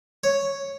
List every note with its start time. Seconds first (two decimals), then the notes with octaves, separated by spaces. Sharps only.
0.24 C#5